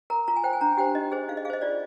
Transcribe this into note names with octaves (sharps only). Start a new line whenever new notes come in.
A#4 A#5
F4 A#5
G#5
C5 G5
G#5
D4 A#5
G4 C5 G5
D#4 D#5
G#4 C5
D#4 F5
D#5
G#4 C5 D#5 F5
F4 D5